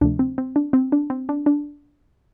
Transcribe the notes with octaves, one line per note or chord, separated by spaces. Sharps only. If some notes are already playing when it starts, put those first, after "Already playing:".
D2 C3 F3 A3 D4
C4
C4
D4
C4
D4
C4
D4
D4